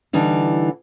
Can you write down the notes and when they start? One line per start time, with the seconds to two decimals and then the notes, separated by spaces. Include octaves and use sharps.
0.13 D3 E3 G3 D#4 E4